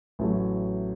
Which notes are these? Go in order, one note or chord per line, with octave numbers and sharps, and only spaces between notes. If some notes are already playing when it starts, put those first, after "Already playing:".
A1 A2 F#3 A3 E4